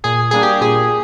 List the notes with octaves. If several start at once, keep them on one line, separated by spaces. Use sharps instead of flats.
A#2 G#4
G3 A#3 D4 G#4
G4
A#2 G#4